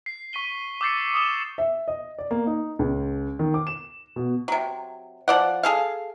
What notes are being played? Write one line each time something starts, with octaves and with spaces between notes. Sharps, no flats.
C7
C#6 B6 D#7 G7
D6 E6 G6 A6 C7 C#7
C#6 D#6 E7 G7
E5
D#5
D5
A#3
D#4
C#2
D#3
D6
E7
B2
C3 F#3
F3 D5 F#5
G#4 A4 F5